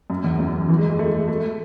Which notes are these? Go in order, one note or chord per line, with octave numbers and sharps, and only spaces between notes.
F#2
E2
F#2
E3
G#3
G#3
A3
A3